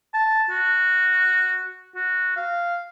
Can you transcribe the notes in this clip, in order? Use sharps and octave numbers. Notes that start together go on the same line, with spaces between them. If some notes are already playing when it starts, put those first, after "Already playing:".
A5
F#4
F#4
F5